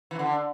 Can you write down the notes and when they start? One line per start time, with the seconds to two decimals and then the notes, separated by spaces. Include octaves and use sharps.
0.11 E3
0.19 D3